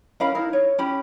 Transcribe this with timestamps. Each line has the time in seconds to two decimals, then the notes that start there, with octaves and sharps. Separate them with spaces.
0.20 C#4 A#4 F5 B5
0.35 D#4 E4 A#4
0.53 C#5
0.78 C#4 G4 B5